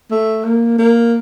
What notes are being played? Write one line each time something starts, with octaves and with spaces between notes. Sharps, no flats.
A3
A#3
A#3